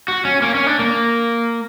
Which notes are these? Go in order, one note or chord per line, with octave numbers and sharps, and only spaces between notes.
F#4
C#4
A#3
C#4
D4
A#3